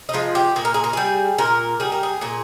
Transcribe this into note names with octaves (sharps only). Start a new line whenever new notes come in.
D#4
F3 G#3 F4
G4
A#2 G#4
A#4
G#4
A#4
G3 G#4
A#2 A#4
G3 G#4
A#4
G#4
A#2 G#4